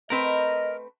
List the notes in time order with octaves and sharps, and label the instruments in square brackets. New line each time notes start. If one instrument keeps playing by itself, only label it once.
[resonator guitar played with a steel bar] A3 C4 B4 [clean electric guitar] A#4 [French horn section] D#5